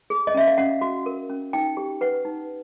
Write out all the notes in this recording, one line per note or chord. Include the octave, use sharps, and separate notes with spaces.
G#4
D#5
C#4 E5
F5
C#4 F#5
F#4
A#4
C#4
D#4 G5
G4
B4 F#5
D#4